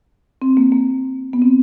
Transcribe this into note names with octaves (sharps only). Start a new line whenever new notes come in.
C4
A#3
A#3
B3
C4